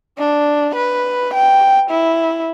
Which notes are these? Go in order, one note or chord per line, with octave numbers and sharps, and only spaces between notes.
D4
B4
G5
E4